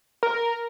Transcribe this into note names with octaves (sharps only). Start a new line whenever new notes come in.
A#4